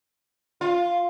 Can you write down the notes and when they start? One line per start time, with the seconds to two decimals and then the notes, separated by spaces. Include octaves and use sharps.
0.61 F4